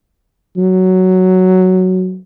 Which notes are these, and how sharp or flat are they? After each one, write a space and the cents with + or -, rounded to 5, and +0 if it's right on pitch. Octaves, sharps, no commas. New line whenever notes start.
F#3 +5